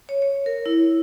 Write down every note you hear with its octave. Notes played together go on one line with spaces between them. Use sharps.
C#5
C#5
A#4
E4